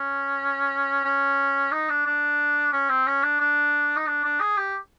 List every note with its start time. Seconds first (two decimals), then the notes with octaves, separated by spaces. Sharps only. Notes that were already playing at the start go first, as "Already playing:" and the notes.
Already playing: C#4
1.04 C#4
1.72 D#4
1.90 D4
2.06 D4
2.73 C#4
2.89 C4
3.07 C#4
3.23 D4
3.40 D4
3.96 D#4
4.07 D4
4.24 D4
4.40 G#4
4.57 G4